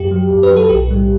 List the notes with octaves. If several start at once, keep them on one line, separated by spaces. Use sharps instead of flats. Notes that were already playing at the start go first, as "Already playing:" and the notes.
Already playing: F#2 G4
F#3
F#2
B4
F#3
A4
B1 G4
A2 G3